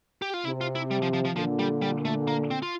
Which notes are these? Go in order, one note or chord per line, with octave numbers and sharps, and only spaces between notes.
G4
F4
C3 E4
F4
E4
G3
F3
F3
F3
A#2 D3 F3
G3
G3
A3
A#3
C4
F4